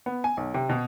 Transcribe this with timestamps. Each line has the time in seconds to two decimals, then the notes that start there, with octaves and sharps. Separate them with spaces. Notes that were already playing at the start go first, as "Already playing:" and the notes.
0.06 B3
0.24 G#5
0.37 B1
0.54 C3
0.69 B2